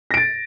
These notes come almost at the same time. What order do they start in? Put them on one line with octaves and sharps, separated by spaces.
A#6 D7 A6